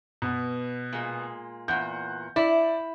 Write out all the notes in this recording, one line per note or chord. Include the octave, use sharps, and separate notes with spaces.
B2 B3
A#2 G#3
E2 A#2 F#5 G6
E4 D5